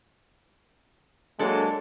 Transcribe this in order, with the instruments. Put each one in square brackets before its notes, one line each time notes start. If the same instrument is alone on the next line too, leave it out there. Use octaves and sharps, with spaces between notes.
[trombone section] F#3 G#3 A#3 [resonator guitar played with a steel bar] D4 A4